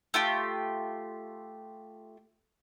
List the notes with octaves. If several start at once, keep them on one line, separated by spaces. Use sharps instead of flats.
A3 F4 G4